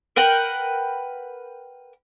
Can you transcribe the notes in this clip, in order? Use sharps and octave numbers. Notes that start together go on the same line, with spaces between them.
A#4 B4 F#5 G5